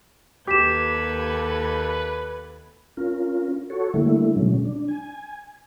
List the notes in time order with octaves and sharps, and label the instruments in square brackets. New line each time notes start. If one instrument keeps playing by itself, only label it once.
[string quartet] D#2 A4 G#6 [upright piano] G4 [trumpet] B4 [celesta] D6 B6 E7
[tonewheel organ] C#4 F4 A#4
F#4 A4 C#5
D3 G3 A3 A#3 E4
B2 F#3 G#3 C#4
D4
G#5